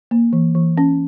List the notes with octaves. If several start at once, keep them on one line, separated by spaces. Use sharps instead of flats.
A#3
E3
E3
C#4